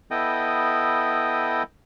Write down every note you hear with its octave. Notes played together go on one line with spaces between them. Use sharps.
B3 E4 A4 D#5 G5 D#6